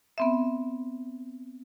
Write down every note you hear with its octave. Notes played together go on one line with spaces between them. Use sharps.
B3 C4 E5